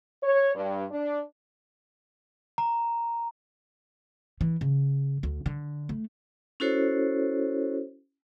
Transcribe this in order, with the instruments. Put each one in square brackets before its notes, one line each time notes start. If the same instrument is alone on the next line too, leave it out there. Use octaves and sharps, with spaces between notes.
[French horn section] C#5
G2
D4
[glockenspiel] A#5
[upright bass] E3
C#3
D2
D3
A3
[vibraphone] C#4 E4 F#4 A4 C5 C#5